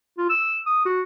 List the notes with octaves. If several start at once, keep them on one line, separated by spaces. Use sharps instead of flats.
F4
E6
D#6
F#4